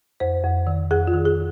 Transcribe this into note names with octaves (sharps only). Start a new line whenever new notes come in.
F2 C5
F2
D#3
F2 G#4
F4
D#3
G#4